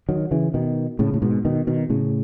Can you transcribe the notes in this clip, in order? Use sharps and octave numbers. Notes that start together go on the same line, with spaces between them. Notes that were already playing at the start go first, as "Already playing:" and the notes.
D#3 F#3
C#3 E3
B2 D#3
A2 C#3
A2
G#2 B2
B2 D#3
B2 D#3
A2 C#3